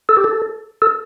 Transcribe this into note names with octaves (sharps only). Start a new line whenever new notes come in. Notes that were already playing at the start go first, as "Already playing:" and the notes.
A4
G4
A4
A4